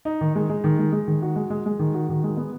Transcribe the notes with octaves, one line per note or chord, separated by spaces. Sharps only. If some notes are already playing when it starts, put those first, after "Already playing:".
D#4
D#3
G#3
G#3
D#3
G#3
G#3
D#3
F#4
G#3
G#3
G#3
D#3
F#4
D#3
G#3
B3